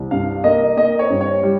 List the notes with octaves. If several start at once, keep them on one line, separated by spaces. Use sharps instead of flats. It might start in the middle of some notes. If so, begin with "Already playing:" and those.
Already playing: C2
G2 F5
A#3 D#5
A#3 D#5
C#5
G2
C#5
G3